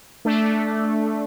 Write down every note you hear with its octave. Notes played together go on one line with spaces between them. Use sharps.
A3 D4